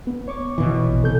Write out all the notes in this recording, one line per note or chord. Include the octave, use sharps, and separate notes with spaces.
B3
C#5 C#6 D6
B2 E3
A#1
C3 A4 G6